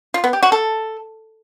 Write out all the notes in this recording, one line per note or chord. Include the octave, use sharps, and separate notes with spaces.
F4
B3
G4
F#4
A4